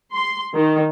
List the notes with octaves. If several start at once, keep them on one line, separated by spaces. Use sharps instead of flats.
C6
D#3